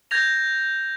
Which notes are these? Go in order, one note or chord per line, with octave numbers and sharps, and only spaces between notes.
G6 G#6 A#6 F7